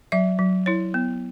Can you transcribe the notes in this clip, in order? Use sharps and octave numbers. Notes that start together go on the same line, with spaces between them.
F#3 E5
F#3
E4 C#5
B3